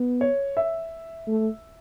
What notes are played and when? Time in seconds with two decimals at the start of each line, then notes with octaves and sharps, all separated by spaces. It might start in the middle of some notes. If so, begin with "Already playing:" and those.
Already playing: B3
0.21 C#5
0.57 E5
1.27 A3